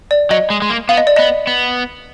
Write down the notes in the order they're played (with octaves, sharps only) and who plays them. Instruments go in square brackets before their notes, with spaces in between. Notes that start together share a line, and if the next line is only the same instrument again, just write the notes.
[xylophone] D5
[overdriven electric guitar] F#3 [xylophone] D#5
[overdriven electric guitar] G#3
G#3
A#3
[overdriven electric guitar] B3 [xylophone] F5
[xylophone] D#5
D5
[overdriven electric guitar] B3 [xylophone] D#5
[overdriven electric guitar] B3